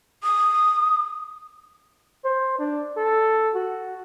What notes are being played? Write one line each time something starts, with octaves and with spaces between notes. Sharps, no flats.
D#6
C5
D4
A4
F#4